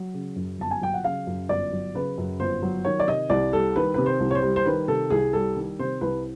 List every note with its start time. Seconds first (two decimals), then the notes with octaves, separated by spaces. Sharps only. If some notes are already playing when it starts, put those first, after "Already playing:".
Already playing: F#3
0.14 C#3
0.36 F#2
0.59 G1 A5
0.71 G#5
0.81 F#3 G5
0.94 F#5
1.04 C#3 F5
1.27 F#2
1.49 G1 D5
1.72 F#3
1.94 C#3 B4
2.18 F#2
2.39 G1 C5
2.62 F#3
2.84 D#3 C#5
3.00 D5
3.07 C3 D#5
3.30 C2 D5
3.52 G3 A4
3.76 D#3 B4
3.94 C3 B4
4.06 C5
4.20 C2
4.31 C#5
4.35 C5
4.43 G3
4.56 C5
4.66 D#3 B4
4.88 C3 A4
5.10 C2 G#4
5.33 G3 A4
5.56 D#3
5.79 C3 C5
6.01 C2 B4